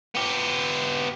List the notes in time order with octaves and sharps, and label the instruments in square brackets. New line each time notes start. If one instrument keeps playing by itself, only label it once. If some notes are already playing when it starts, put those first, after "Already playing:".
[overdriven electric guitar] B3 G4